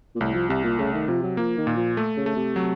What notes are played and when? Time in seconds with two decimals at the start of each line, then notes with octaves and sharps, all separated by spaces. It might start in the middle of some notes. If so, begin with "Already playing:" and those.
0.16 A#2
0.20 C2 A2
0.34 F3
0.49 C2 C3
0.64 A#2
0.79 C#3 A3
0.94 D#3
1.08 C3 F3
1.23 F#3
1.37 F3 A#3
1.58 D#3
1.67 A#2
1.77 F3
1.97 A3
2.17 C#3
2.26 A3
2.36 C3
2.56 F#3